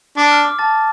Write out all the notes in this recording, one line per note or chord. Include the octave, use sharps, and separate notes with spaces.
D4 D6
F6
D6
A5 A6